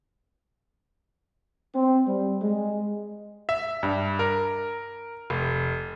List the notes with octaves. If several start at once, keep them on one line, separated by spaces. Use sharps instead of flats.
C4
G3
G#3
E5
G2
A#4
F1